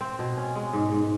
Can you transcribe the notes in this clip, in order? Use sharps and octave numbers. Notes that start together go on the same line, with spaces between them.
C4
B2
C#4
G#3
G#2
G#2